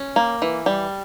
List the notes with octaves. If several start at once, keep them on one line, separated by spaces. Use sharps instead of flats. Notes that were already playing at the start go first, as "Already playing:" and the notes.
Already playing: C#4
A#3
E3
G3